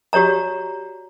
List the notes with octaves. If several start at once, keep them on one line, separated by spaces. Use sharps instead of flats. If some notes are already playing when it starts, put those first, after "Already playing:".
F#4 G4 C#5 D5 A#5